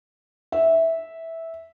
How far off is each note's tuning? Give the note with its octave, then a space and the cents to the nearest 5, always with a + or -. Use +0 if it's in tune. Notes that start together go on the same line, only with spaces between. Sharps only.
E5 -10